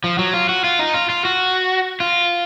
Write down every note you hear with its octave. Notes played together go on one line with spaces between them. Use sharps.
F3
F#3
F4
F#4
F4
D#4
F4
F4
F#4
F4